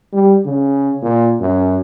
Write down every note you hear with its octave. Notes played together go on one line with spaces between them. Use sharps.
G3
C#3
A#2
F#2